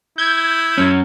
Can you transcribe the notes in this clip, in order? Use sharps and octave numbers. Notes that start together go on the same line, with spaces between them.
E4 G6 G#6
F#2 C#4